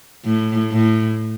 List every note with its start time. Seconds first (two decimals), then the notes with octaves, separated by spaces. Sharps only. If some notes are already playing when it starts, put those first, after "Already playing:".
0.25 A2
0.72 A2